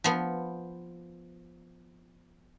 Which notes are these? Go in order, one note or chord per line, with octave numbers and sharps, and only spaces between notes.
F3 B3